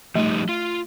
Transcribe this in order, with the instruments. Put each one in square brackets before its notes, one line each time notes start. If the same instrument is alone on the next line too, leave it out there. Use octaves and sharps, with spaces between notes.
[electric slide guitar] F3 G3 D#4 [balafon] A3
[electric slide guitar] F4